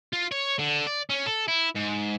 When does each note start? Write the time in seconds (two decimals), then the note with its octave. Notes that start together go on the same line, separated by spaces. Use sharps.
0.13 F4
0.32 C#5
0.59 D3
0.87 D5
1.10 C#4
1.26 A4
1.48 E4
1.76 G#2